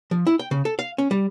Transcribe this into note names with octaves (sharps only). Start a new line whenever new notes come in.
F3
E4
G5
C#3
A4
F5
C#4
G3